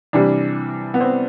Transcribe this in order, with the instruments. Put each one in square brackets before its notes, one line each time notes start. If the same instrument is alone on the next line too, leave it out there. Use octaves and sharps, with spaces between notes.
[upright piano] C3 E3 G3 D4
B3
C4